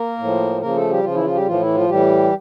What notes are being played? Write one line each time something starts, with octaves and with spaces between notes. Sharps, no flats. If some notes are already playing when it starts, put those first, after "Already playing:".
Already playing: A#3 A#4
A2
F3
C#3 F3 A#3 A#4
A3 A4
G3 G4
C#3 F3 F4
E3 E4
F3 F4
G3 G4
A2 E3 F3 F4
E3 E4
F3 F4
A2 E3 G3 G4